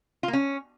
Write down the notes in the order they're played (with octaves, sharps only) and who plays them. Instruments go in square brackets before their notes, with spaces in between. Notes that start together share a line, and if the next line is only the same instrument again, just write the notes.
[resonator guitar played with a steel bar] F4
A#3
C#4